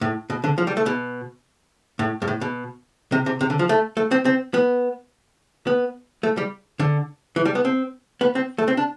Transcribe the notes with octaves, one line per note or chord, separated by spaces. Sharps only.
A2
B2
D3
F3
G3
A3
B2
A2
G2
A2
B2
C3
C3
C3
D3
F3
A3
A3
C4
C4
B3
B3
A3
G3
D3
E3
G3
B3
C4
B3
C4
A3
C4
D4